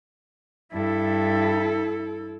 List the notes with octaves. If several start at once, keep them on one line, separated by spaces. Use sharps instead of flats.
G2 E4 A4 E5